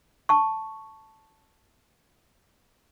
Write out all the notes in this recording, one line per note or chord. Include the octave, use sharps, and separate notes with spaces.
A5 C#6